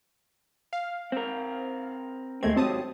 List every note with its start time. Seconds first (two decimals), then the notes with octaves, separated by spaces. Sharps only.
0.73 F5
1.12 C4 A#4
2.43 D#2 G#3 A3 C4 G#6
2.56 C3 F#3 C4 A5 D#6